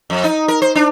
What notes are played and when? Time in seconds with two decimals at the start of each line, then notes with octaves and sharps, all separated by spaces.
0.10 F2
0.24 D#4
0.48 A#4
0.62 C5
0.75 D4